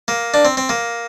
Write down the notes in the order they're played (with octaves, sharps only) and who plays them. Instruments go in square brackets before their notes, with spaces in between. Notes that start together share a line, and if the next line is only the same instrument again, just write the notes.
[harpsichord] A#3
D4
C4
C4
A#3